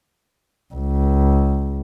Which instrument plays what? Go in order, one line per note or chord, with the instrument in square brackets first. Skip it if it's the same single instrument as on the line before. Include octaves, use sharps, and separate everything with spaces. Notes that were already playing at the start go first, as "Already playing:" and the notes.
[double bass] C#2